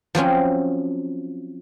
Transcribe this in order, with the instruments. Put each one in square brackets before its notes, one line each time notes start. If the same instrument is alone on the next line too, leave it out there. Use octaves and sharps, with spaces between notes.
[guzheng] F3 F#3 C4 C#4